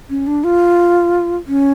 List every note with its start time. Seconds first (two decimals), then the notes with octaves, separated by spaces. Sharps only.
0.10 C#4
0.27 D4
0.44 F4
1.47 C#4